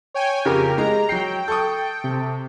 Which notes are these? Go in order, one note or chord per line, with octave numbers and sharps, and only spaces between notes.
C#5 G5 G#5
F2 C#3 G4 A#4
G#3 A#5
F#3 G5 C7
A4 C#6 D#6
C3